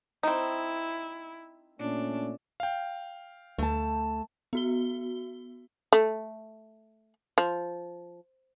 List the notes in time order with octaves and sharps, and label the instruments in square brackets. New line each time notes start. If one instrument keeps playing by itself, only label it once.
[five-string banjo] C4 D#4 [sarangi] E4
[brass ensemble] A#2 A3 C#4 [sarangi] D4
[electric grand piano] F5 G5
[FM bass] D2 [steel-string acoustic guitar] A3 A5
[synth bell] B3 F#4 G7
[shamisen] A3
F3